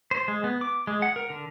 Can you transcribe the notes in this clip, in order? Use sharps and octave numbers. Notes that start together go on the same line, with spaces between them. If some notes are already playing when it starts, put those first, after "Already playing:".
C5
G#3
B3
D6
G#3
F#5
A#4
D3